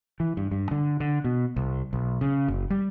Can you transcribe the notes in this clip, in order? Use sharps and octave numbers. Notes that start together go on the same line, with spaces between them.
E3
G2
G2
D3
D3
B2
C2
B1
C#3
F#1
G3